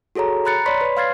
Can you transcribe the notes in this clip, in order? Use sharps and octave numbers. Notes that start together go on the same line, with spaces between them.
F#4 G#4 A4 C#5 A#5
A#5 B5 F#6 A6 C#7
C#5 D5 B5 C6 B6
B4 C#5
F5 C6 F6 G#6 A6 C7